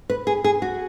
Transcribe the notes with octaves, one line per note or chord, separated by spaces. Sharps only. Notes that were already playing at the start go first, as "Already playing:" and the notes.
B4
G#4
G#4
F#4